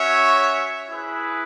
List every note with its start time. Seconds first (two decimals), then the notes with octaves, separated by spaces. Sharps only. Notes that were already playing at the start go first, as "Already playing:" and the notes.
Already playing: C#4 F#4 C#5 E5
0.88 E4 G#4 B4